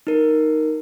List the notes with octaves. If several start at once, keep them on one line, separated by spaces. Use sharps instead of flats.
D#4 A#4